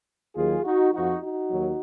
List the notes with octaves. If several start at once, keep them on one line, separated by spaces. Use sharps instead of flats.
D#2 D#3 F#3 F4 G#4
D#4 F#4
F2 F3 D#4 F#4
D#4 F#4
D#2 D#3 F#3